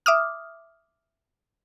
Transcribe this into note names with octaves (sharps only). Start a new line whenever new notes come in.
E5 D6 D#6 F6